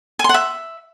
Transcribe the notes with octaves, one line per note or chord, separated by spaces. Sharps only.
G#5
C6
F#5
E5